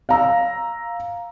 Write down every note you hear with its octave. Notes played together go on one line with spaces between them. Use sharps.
F5 A#5 E6